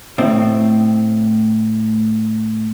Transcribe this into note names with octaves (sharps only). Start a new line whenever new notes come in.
A2 C4